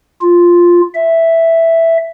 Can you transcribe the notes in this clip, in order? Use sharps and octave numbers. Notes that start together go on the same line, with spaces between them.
F4
E5